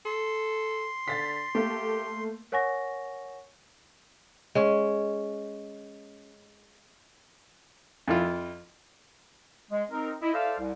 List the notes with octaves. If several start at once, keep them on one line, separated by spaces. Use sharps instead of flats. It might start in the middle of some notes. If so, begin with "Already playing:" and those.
A4 C6
D3 A6 B6
A3 A#3 G4
A#4 C#5 F#5 G#5 C#6 A#6
G#3 C#4
F2 E4 F4
G#3
C4 D#4 A#4
E4 D#5
A4 C5 D5 E5 F5
C2